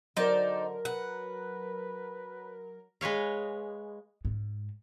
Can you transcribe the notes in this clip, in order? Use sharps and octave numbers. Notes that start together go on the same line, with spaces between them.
D3 F#3 D#4 A#4 C5 D5
B4 F#5
G#3 B4 C#5 F5
G#2